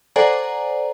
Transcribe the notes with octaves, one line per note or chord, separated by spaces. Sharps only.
A4 C5 D5 F#5 G#5 A#5